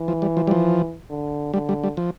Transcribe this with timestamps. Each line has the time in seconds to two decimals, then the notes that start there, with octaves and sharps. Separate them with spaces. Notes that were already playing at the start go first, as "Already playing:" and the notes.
Already playing: E3
0.08 F3
0.22 G3
0.37 F3
0.47 G3
0.51 F3
1.10 D3
1.54 D3 G3
1.69 G3
1.84 G3
1.97 F3